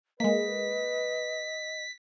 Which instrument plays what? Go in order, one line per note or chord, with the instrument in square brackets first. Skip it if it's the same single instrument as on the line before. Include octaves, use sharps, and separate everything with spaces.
[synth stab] G#3 A#3 [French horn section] B4 [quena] D#5 [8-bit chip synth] B6